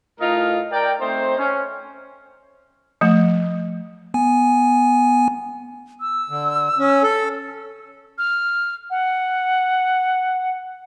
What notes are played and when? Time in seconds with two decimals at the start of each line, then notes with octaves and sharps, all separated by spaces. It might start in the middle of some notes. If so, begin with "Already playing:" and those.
0.20 A2 A3 D#4 F4 A#4 D#5
0.72 A#4 D5 G5
1.00 A3 C4 D#4 C5
1.38 C#4
3.01 F3 A3
4.14 B3 G#5
6.01 E6
6.30 D3
6.79 C#4
7.03 A4
8.18 F6
8.90 F#5